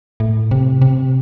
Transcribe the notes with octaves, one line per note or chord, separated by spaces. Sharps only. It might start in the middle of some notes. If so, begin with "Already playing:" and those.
A2
C3
C3